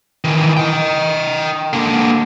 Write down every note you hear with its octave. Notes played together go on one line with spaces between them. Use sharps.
D#3 E3
D#5 G5
D3 A#3